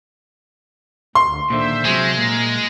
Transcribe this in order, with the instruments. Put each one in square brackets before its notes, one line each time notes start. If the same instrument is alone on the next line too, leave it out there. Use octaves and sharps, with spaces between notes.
[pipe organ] D2 [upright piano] C6
[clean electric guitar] A#2 D3 D#3 [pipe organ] C5 E5
[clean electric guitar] C3 F#3 G#4 [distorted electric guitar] G#3
[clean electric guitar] A#2 [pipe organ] A#4